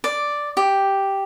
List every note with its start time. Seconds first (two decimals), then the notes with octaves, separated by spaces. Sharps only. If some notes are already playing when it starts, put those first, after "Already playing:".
0.04 D5
0.57 G4